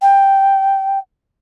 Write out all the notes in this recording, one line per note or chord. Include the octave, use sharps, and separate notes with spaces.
G5